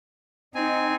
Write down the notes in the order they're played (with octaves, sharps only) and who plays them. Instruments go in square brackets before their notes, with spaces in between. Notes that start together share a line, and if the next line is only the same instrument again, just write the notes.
[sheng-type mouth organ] C4 G#5 [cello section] D#4